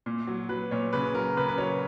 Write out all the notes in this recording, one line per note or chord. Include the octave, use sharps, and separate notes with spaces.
A#2
F#3
F#3 B4
A#2 C#5
C#3 B4
F#3 A#4
C#3 B4
B4
F#3 C#5